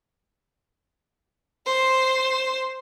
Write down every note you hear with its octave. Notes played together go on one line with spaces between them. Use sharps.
C5 E7